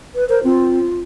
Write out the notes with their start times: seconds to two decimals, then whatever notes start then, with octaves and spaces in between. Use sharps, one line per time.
0.15 B4
0.29 A#4 C5
0.44 C4 F4